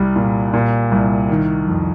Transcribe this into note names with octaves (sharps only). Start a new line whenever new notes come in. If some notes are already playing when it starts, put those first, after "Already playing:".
Already playing: C2 G3
A#2
A#2
C2
D#3
F2